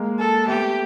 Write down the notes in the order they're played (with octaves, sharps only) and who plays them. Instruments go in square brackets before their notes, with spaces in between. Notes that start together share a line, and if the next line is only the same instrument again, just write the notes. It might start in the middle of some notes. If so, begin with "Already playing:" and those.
Already playing: [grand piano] G#3 A#3
[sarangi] A4
[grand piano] A3 B3 [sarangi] G4